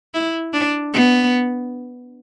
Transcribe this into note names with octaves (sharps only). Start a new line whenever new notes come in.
E4
D4
B3